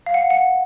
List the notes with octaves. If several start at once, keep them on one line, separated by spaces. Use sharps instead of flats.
F5
F#5
F#5